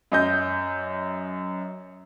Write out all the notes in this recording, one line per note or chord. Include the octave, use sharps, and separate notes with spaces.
F#2 D#5 G6